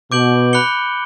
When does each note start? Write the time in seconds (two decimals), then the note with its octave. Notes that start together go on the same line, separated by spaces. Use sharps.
0.12 B2 D6 G6 D7 F#7
0.53 B5 F#6 C#7 G7